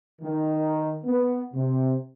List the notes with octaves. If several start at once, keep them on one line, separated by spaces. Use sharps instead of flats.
D#3
B3
C3